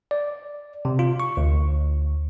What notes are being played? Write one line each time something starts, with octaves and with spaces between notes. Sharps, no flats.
D5
C3
F4
C#6
D2